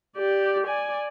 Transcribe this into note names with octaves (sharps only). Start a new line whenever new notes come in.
G4 D5
D5 G#5